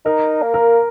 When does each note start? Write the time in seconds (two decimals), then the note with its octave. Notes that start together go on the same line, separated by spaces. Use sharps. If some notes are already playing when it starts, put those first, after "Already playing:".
0.05 D#4 A#4
0.42 A#3
0.54 A#4